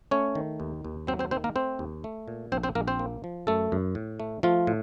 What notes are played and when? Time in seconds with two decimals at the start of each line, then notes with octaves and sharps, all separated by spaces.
0.11 A3 C#4 C#5
0.35 D#3
0.60 D#2
0.85 D#2
1.07 F#3 C4 C5
1.19 C4 C5
1.31 D#3 C4 C5
1.44 A#3 A#4
1.56 A3 C4 C5
1.79 D#2
2.04 A3
2.28 A#2
2.52 A#1 C4 C5
2.63 C4 C5
2.75 A#1 A#3 A#4
2.88 C4 C5
2.99 A#3
3.24 F3
3.47 F#2 A3 A4
3.72 F#2
3.95 A2
4.20 A3
4.43 F3 A3 F4
4.67 A2